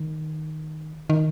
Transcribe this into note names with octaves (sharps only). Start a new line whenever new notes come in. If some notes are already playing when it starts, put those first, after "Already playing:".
Already playing: D#3
D#3